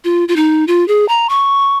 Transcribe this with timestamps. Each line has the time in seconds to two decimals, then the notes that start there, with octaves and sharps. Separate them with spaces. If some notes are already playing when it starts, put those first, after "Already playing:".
0.05 F4
0.28 F4
0.36 D#4
0.68 F4
0.88 G#4
1.09 A#5
1.29 C#6